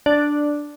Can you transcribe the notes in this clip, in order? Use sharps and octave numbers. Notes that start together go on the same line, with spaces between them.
D4